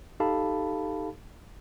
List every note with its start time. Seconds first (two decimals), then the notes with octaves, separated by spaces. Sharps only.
0.20 D#4 G4 A4 F5 A5 B5